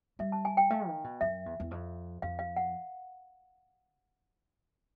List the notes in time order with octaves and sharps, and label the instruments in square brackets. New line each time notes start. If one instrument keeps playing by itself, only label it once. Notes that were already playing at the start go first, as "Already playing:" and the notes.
[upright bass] G3 [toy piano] E5
[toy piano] A5
G#5
G5
[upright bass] A3 [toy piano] F5
[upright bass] D#3
B2
[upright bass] F#2 [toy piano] E5
[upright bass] E2
E2
F2
[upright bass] F2 [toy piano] F5
[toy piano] F5
F#5